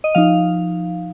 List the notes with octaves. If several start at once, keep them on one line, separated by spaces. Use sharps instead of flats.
D#5
F3 D#4 F5